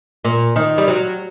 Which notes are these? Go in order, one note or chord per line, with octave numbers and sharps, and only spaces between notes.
A#2
D#3
G3
F#3